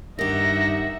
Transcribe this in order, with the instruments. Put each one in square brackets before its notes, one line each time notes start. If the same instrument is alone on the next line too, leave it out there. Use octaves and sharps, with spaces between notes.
[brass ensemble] G2 [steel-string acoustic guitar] D#3 G4 [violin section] D#4 E5 F#5 [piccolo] A#6